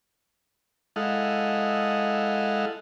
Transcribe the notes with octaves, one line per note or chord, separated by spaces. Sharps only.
G#3 E4 A4 D#5 F5 F#5